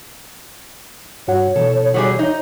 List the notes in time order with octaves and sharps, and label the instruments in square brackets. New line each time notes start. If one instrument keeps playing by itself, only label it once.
[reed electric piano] G2 F#4 F#5 [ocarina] C#5
[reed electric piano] B2 E3 [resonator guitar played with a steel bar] A4
[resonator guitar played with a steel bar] F#3 G3 G#4
D#4